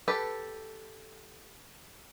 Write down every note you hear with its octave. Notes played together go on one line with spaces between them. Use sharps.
G4 A4 B4